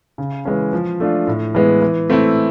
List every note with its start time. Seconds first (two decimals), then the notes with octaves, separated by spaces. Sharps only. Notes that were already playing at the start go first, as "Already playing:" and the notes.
0.18 C#3
0.45 E3 G#3 C#4
0.73 F3
1.00 A3 D4 F4
1.27 A2
1.55 E3 G#3 B3
1.82 E3
2.10 A3 C4 E4